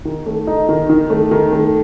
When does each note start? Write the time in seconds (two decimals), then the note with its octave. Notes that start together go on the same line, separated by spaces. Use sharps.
0.05 D#3
0.26 A3
0.47 D#4
0.69 D#3
0.89 D#3
1.10 A3
1.31 D#3
1.52 A3